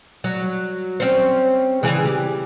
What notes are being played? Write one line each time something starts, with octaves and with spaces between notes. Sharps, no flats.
F#3
C4 C#4 C5
C#3 E3 G#4
G4